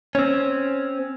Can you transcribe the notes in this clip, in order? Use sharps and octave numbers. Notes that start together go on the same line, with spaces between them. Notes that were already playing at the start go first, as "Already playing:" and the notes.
C4 C#4